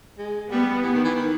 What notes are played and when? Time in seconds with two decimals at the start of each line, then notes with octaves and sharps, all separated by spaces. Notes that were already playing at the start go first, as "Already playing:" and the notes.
0.18 G#3
0.51 G3 B3
0.83 E3
0.94 D#3
1.04 E3
1.15 D#3